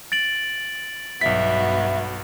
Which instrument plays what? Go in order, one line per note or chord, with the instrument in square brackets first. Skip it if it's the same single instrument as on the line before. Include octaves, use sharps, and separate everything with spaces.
[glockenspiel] A6 D7 F#7
[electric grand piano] B1 B6 [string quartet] G2 B3 F#4 [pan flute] E5